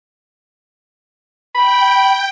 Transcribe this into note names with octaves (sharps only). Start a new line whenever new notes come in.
G5 B5